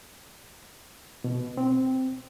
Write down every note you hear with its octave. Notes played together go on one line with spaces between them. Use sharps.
B2
C4